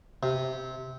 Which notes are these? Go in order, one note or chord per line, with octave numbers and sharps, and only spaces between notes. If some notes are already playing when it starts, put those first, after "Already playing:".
C3